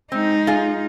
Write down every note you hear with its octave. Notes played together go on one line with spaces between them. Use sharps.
G#3 C4 D#4
F4 G#4